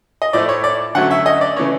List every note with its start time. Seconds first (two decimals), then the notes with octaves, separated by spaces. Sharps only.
0.22 D#5
0.33 A2 F3 A3 D5
0.49 C#5
0.64 D5
0.95 D3 F#3 A3 C#4 F#5
1.11 E5
1.26 D#5
1.41 D5
1.57 C#3 E3 A3 C#4 C#5